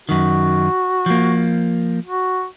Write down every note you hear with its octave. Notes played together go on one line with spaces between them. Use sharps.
F#2 D#3 F#4
F3 A#3
F#4